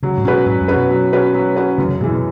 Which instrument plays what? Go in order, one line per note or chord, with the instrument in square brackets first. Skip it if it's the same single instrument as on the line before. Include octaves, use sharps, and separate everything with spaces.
[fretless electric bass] C#3 [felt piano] F#3
[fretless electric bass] G#2
[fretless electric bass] B2 [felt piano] C#4 F#4 B4
[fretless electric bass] G#2 [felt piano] F#3
[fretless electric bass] F#2
[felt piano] C#4 F#4 B4
[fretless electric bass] B2
[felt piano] F#3
C#4 F#4 B4
F#3
C#4 F#4 B4
[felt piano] F#2 [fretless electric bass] C#3
[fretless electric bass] C#3
[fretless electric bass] B2 [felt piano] E3 G#3
[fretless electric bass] B2